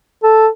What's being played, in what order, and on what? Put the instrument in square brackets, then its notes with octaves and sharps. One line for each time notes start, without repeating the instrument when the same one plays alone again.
[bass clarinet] A4